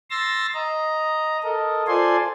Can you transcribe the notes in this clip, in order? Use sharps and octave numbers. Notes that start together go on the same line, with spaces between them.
C6 E6 A6 A#6
D#5 A#5
A4 A#4 D#5
F4 A4 C5 D5 G#5 C6